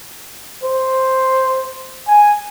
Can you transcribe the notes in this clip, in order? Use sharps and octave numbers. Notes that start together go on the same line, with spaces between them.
C5
G#5